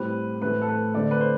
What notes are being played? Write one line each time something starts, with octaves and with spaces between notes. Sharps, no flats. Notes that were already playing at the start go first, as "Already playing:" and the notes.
Already playing: A2 G3 C4 B4
A2 E3 A3 C4 B4
A4
B4
D3 A3 C4 D5
B4
C5